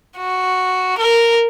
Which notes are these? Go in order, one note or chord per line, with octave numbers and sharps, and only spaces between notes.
F#4
A#4